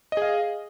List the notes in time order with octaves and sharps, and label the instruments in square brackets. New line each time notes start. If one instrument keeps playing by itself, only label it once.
[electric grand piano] D#5
G#4
F5